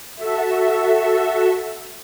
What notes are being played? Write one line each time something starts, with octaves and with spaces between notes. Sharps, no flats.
F#4 A4 E5